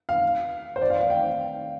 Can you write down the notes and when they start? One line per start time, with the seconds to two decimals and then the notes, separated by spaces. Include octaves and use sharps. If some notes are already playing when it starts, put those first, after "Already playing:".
0.09 F5
0.76 C5
0.82 D5
0.90 F5
1.01 F5
1.10 G5